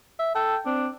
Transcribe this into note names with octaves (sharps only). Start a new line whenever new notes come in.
E5
A4 G5
C4 D4